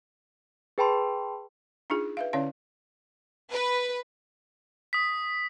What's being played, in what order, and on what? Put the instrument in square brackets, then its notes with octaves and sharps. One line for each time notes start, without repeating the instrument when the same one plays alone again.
[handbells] G#4 B4 G5 A5 B5 C6
[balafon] D4 D#4 F4 G#4
B4 E5 F5
D3 C#4 E4 C#5 D5 F5
[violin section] B4
[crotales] D#6 B6